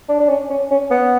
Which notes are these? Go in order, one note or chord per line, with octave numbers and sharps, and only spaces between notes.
D4
D4
C#4
C#4
C#4
B3